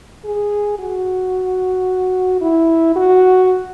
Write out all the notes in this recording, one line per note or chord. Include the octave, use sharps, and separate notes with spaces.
G#4
F#4
E4
F#4